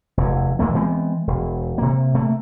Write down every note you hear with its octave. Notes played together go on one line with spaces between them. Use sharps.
F1 E2
D#2 A#2 A3 A#3
E3 G#3 B3 C4
E1
C3 A#3
C3 A3 A#3